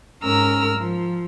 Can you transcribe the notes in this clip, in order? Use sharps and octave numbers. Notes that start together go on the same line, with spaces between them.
G#2 C#4 A#4 A#5 E6 F6
F3